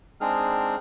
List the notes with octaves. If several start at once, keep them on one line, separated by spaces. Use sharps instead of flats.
G#3 C4 D4 D#4 G#4 F6